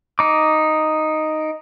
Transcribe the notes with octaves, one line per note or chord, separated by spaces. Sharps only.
D#4 D6